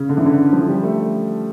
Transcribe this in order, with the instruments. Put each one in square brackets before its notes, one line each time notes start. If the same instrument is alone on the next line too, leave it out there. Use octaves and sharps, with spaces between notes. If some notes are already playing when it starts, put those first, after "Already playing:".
Already playing: [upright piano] C#3
D3
E3
D3
F3
G3
A3